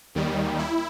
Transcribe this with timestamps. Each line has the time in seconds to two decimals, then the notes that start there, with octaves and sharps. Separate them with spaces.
0.15 D#2 D#3 G3
0.59 E4